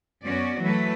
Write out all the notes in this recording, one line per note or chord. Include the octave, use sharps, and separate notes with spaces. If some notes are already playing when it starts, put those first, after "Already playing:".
F#2 B3 C#4 F#4 D5
E3 F#3 A3 B4